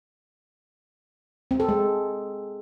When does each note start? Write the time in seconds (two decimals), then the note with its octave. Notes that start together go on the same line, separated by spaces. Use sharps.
1.51 C4
1.60 A4
1.69 G#3